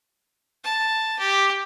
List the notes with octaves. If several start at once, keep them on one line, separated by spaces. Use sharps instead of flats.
A5
G4